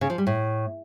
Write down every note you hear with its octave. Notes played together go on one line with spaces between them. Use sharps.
C#3
F3
G3
A2